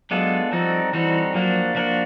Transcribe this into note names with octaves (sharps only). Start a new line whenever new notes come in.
F#3 G#3 B3 D4 F4 A4
F3 G3 C4 D#4 F#4 A4
E3 G3 C4 D#4 F#4 A4
F3 F#3 A#3 D4 F#4
F3 A#3 D4 F#4